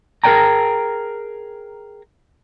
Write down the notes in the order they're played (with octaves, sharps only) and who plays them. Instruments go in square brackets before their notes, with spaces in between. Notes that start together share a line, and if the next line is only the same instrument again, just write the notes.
[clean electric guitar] G#4 A#4 B4 D5 G5 A#5